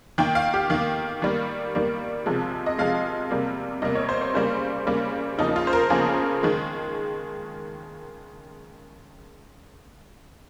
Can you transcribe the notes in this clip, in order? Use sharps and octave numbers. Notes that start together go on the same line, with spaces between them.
D#3 A#3 G5
F5
G4
D#3 A#3 F5
D#3 G3 A#3
D#3 G3 A#3
C3 F3 G#3
D#5
C3 F3 G#3 F5
C3 G3 A#3
C3 G3 A#3 D#5
C#5
C5
C#5
C#3 G3 A#3 C5
C#3 G3 A#3
C#3 F3 A#3 D#4
D#4
F4
C5
A#4
C#3 F3 A#3 G#4
D#3 G#3